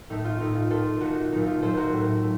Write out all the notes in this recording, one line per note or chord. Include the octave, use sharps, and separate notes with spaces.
A2 A3 D#4
F4
A2 A3 D#4
F4
A#2 A3 F4 A4
A#2 A3 D#4 F#4
A#2 F#3 A3 D#4
F4
A#2 F#3 A3 A4 C5
F#4 A#4
A2 A3
A3